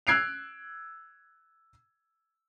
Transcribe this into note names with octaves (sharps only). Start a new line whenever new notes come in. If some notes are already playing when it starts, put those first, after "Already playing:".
E6 F#6 G#6 C7 D7 F7